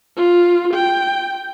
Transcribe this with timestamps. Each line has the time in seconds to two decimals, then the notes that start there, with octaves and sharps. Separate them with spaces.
0.17 F4
0.73 G5